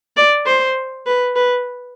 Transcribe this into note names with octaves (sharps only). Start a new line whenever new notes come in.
D5
C5
B4
B4